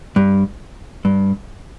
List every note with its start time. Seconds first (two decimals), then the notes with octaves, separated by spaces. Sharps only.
0.16 G2
1.05 G2